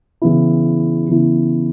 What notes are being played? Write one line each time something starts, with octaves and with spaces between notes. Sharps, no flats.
C#3 E3 B3 E4
C#3 E3 B3 E4